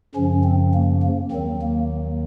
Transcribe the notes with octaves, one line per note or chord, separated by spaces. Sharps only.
F#2 C#3 F3 C#4
C4
A#3
A#3
D#2 D#3 F#3 C4
A#3